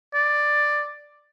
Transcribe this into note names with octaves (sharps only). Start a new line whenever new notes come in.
D5